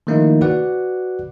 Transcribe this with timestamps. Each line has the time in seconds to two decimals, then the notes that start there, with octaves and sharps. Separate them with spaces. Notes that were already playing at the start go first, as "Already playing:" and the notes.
0.07 D#3 F3 A3 A#3 D#4 E4
0.41 F#4 B4 D5 F#5